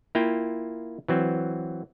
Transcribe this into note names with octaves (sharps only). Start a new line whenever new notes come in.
A#3 E4 F4 G5
E3 F#3 C4